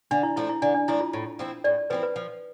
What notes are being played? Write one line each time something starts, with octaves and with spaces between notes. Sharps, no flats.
D3 D4
E4
F3 A3 D4 E4
E4
D3 D4
D4
F3 A3 D4 E4
F4
A2
F3 C4 E4
A2 D5
D5
F3 C4 E4 B4
B4
F3